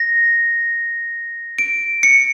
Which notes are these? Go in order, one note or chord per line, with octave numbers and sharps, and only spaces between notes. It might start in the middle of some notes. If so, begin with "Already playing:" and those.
Already playing: A#6
D7
C#7